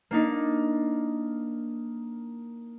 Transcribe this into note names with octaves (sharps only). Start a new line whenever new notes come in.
A#3 D4 D#4